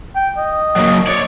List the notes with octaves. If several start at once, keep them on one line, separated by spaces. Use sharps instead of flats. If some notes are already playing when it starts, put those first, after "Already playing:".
G5
D#5
F#3 A#3
C#5 D5